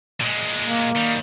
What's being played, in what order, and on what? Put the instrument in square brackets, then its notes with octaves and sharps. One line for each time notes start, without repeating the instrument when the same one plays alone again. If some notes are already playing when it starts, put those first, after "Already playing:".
[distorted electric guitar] A#2 G#3
[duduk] A#3
[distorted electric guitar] D#3 G3